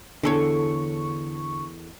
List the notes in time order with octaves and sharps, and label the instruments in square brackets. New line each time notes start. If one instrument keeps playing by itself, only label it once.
[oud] E2 A4 C#5 [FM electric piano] D3 C#6